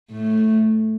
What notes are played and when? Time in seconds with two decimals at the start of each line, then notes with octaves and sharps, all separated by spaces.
0.11 A2 A3